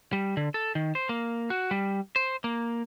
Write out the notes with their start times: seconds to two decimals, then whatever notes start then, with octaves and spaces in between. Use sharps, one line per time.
0.13 G3
0.37 D3
0.54 A4
0.75 D#3
0.95 C5
1.09 A#3
1.50 F#4
1.71 G3
2.16 C5
2.44 A#3